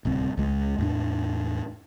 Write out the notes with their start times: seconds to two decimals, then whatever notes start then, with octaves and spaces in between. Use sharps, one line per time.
0.05 D1 C2 C4
0.37 C#2 G#3
0.79 E2 A2 D4